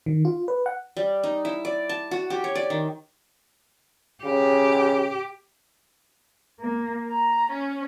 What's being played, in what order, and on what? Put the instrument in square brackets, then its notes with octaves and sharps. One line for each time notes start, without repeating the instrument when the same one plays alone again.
[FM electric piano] D#3
F4
B4
F#5
[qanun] G3
D#4
E4
D5
A5
F#4
G4
C#5
D5
D#3
[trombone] C#3 [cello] G4
[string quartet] A#3
A#5
C#4